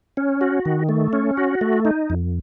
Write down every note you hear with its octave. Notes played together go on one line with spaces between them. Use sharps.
C#4
F#4
D#3
A3
C#4
F#4
A3
D#4
F2